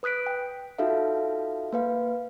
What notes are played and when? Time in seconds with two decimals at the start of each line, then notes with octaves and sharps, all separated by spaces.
0.03 B4 D#6 F#6 B6 D7
0.26 G5
0.78 D#4 F4 F#4 A4 E5 F5
1.73 A#3 B4 F5